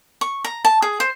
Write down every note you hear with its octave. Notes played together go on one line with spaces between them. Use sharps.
C#6
A#5
A5
G#4
C5